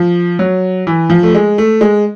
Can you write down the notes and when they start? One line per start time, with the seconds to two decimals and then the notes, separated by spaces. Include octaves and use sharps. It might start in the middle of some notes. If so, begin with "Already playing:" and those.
Already playing: F3
0.39 F#3
0.87 E3
1.10 F3
1.23 A3
1.35 G#3
1.58 A3
1.81 G#3